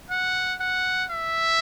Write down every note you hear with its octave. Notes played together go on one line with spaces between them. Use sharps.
F#5
F#5
E5